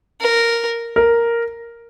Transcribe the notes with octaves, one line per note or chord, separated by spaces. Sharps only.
A#4
A#4